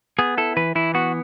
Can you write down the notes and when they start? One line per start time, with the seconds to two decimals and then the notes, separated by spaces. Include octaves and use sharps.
0.19 B3 G#4
0.37 E4 A4
0.57 E3 B4
0.75 E3 E4
0.94 B3 F#4